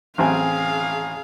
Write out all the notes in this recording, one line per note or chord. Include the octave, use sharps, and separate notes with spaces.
A1 C4 G#4 F5 G#5